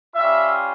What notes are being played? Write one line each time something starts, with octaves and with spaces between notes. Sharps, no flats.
G3 C#4 F4 E5